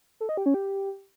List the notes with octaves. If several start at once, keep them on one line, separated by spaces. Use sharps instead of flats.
A4
D#5
G4
C#4
G4